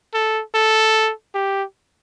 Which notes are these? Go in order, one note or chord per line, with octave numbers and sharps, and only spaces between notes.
A4
A4
G4